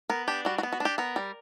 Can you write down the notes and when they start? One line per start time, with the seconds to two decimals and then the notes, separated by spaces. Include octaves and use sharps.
0.09 B3 A#4
0.28 D4 G4
0.45 G3 F#4
0.58 F#4
0.63 B3
0.72 F#4
0.80 D4 G4
0.98 B3 A#4
1.16 G3